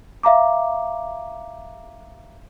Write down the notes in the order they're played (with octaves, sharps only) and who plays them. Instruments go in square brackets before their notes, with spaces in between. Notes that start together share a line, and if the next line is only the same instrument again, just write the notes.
[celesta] E5 F5 A#5 D6